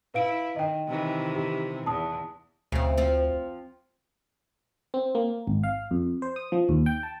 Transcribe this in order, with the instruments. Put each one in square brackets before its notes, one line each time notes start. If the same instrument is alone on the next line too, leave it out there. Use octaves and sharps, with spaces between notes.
[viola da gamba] E4 [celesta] B4 F5 D7
[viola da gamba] D#3 [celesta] D#5 G5
[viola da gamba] C3 D#3 E3
[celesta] G4
[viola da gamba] E2 [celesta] A5 D#6
[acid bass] D2 [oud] C#3 C4
[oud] F3 C4
[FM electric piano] C4
A#3
G#1
F5
F2
C5
D#6
F3
D#2
G5
A5